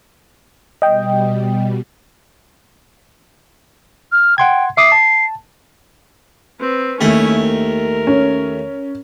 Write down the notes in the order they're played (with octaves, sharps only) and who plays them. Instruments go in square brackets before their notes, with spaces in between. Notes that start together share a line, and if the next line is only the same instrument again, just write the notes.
[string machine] B2 G3 [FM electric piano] D#5 G5
[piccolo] F6
[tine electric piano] F#5 C6 G#6 [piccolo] G5
[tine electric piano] E5 D6 D#6 [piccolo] C7
[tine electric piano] A5
[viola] C4 B4
[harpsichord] D#2 A3 [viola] C#4 E4
[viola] A#4
[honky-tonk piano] C#4